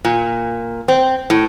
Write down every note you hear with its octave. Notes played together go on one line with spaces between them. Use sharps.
A#2
C4
A2